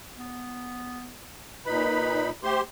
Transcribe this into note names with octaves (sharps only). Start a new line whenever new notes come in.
B3
A#2 D#4 B4 B5
A3 G4 C5 C6